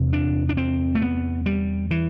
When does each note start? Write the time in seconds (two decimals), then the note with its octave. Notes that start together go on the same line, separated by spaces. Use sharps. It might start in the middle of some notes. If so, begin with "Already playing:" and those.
Already playing: E2 C3
0.13 D4
0.49 D4
0.57 C4
0.95 A3
1.02 B3
1.46 G3
1.91 E3